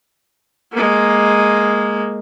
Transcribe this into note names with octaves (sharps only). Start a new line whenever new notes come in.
G#3 A#3